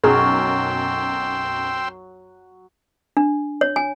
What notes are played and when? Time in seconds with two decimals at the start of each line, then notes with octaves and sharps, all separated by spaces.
0.04 B1 F#2 F#3 G#4 G5 C6 E6 F6
3.17 D4
3.61 C#5
3.76 G#5